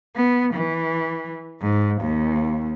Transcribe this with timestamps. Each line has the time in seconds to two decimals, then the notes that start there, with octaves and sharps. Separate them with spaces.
0.16 B3
0.54 E3
1.61 G#2
2.02 D#2